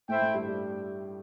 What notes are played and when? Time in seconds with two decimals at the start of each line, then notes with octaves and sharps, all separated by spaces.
0.09 A2 A3 E4 C5 E5 G5
0.22 A2 A3
0.34 G2 G3
0.48 G3